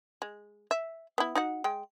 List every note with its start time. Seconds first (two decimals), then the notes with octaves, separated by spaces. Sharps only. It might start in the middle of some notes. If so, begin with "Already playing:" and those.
0.22 G#3
0.71 E5
1.18 B3 E4
1.35 D#4 F#4 F#5
1.64 G#3 G5